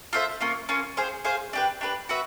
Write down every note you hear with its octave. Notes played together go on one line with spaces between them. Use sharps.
F4 A4 C5 E5
A#3 C#4 F4
A#3 C#4 F4
G#4 C5 F5
G#4 C5 F5
D4 G4 B4
D4 G4 B4
F#4 B4 E5